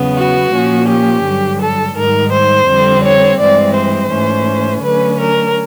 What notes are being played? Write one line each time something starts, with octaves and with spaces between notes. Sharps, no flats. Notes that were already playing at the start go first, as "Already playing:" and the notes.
Already playing: E2 C#3 F#3 B3
F#4
A#2 F3 A#3 C#4
G4
G2 D3 F#3
A4
G#2 D#3 G3 A#4
C5
F2 D3 G3 C4
C#5
G2 E3 G#3 C4 D5
C5
G#2 E3 A3 C#4
D3 F#3 A3 C#4 B4
A#4